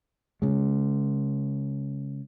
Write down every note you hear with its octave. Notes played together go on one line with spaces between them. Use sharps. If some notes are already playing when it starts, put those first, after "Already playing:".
C#3 G#3